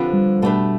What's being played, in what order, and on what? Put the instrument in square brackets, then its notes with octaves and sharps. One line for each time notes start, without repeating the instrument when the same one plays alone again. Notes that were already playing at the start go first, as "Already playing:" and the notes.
Already playing: [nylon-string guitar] D3 F3 C4 G4 B4
[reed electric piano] G3
[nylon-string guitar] B2 A3 D4 G4 B4